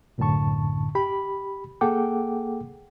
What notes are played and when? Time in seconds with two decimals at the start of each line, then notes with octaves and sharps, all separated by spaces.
0.18 C2 F#2 A2 D3 A5 C#6
0.95 G4 B5
1.81 A#3 G#4 A4 F#5 G5 D6